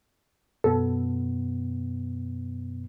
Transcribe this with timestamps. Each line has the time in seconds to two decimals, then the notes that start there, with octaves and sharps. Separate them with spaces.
0.64 F#2 B2 B3 A4